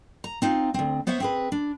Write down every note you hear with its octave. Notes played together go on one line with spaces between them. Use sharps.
A#5
C4 D#4 F4
D2 C4
B3 C5 C#5 E5 F#5
C4 G#4 B4
D4